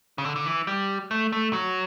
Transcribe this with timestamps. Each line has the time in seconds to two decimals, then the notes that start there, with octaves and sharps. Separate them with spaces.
0.18 C#3
0.25 D3
0.36 D3
0.46 E3
0.67 G3
1.11 A3
1.32 A3
1.53 F#3